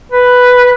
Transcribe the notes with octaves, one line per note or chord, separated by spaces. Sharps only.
B4